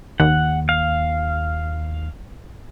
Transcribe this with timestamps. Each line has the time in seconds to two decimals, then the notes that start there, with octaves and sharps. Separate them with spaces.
0.20 D#2 F#5
0.69 F5